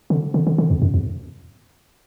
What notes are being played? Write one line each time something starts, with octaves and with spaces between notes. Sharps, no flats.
D3
D3
D3
D3
E2
F#2
E2